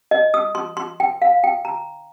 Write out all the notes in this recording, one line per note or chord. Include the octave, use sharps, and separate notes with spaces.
D#5
D#6
C6
C6
G5
F5
G5
A#5